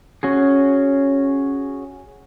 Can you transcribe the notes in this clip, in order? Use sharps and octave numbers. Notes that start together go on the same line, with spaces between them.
C#4 F#4 G#4